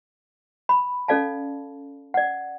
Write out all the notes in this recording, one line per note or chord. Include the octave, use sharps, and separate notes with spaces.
B5
C#4 A4 D5 F5 A5
D5 F#5